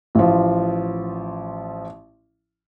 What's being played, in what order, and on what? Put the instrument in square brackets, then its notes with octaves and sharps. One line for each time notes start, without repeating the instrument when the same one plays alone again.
[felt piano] A1 F3